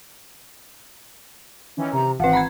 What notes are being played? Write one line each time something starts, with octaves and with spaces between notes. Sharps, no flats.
D#3 E3 C#4
C3 A#5
G#1 E3 C4 B4 F#5
A#5 B5 G#6